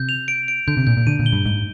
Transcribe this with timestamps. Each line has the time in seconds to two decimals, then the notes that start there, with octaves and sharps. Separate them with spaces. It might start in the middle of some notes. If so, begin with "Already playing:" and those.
Already playing: C3 G6
0.09 F7
0.28 D7
0.48 D7
0.68 D3 G6
0.77 C3
0.87 A#2 G6
0.97 A#2
1.07 D3 D#7
1.19 A#2
1.26 G7
1.32 G2
1.45 G#2 G7